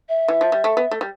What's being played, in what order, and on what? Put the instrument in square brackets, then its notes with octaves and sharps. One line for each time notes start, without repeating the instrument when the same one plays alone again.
[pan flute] E5
[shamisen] E3
F3
G3
A3
B3
A3
G3